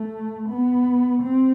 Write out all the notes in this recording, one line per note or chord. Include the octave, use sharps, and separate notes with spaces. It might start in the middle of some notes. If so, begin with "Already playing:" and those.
Already playing: A3
B3
C4